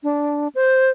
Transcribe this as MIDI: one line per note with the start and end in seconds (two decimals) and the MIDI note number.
0.03 0.48 62
0.55 0.90 72